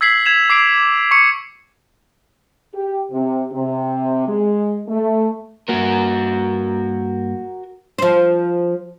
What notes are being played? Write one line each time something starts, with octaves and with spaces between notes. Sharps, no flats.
E6 G#6 B6 C7 F#7
G#6 E7 F7
D6 C7 D7
C#6 C#7
G4
C3
C3
G#3
A3
G2 A#3 F#4 A#4
F3 C5